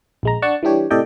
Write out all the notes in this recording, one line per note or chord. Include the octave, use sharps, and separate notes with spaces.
A#1 G#3 A#5
D4 D5 F#5 A5 C#6
E3 G3 D4 G4 C#5
A2 C3 A4 D5 D#5 G5